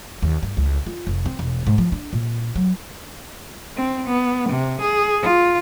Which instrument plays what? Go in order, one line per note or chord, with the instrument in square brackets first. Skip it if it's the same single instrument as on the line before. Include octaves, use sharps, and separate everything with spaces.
[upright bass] D#2
G2
C#2
F4
F1
C4
E1
G#2
F3
D4
A#2
F#3
[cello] C4
B3
C3
G#4
F4